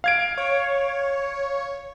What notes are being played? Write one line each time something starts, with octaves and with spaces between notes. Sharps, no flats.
F5 G#6 D7
C#5